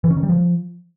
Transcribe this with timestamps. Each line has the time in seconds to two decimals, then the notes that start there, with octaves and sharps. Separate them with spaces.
0.04 E3
0.10 C#4
0.17 D#3
0.23 G3
0.29 F3